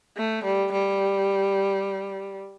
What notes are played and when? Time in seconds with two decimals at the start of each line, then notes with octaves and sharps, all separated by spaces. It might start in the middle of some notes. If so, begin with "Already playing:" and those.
0.17 A3
0.44 G3
0.72 G3